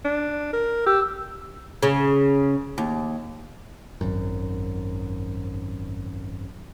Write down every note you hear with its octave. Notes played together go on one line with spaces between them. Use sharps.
D4
A#4
G4 E6
C#3
D#2
G#1 F#2